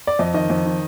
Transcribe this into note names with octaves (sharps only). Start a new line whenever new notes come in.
D5
F2 D#5
D#3 D#5
F2
D#3